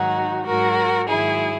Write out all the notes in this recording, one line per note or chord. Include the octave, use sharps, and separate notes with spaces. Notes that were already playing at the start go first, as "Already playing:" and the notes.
Already playing: G#2 D#3 F#3 D#4 F#4
G#2 F#3 F#4 A#4
G#2 D#3 F#3 E4 G#4